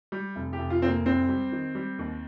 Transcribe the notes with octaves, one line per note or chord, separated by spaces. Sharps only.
G3
F1
G4
F1
F4
F1 C4
A#3
C2 C4
G3
D#3
G3
D#2